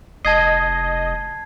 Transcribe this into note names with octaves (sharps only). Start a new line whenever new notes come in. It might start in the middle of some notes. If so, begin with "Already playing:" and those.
F1 D#5 A5 G#6 C7